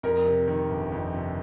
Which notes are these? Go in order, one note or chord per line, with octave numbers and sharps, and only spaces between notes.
F2 A#4
C3
D#3
G1
F2
C3